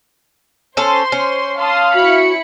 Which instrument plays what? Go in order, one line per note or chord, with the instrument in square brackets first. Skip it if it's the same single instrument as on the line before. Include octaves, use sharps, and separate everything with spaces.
[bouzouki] C#4 A4 [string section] C5 C6
[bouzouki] C#4
[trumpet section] F5 [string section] A5 C6 D#6
[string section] E4 B5 C#7 [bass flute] F#4